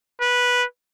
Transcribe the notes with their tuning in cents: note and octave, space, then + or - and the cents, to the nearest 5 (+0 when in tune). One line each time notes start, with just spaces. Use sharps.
B4 -10